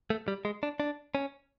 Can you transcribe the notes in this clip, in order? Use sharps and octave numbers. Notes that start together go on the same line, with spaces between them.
A3
G3
G#3
D4
D4
C#4